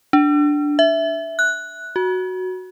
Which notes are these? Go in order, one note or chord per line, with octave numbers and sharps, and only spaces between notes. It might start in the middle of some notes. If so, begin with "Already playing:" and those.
D4
E5
F#6
F#4